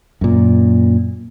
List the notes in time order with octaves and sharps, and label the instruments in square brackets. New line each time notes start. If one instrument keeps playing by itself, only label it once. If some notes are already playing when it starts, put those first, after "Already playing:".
[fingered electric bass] F#2 A#2